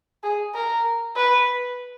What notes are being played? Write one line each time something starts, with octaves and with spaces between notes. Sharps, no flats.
G#4
A#4
B4